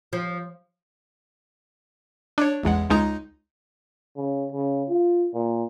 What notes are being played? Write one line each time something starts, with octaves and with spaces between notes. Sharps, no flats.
F3
D4 C#5
A1 E2 G#3 F#5
C#2 G#3 D#4 A#5
C#3
C#3
F4
A#2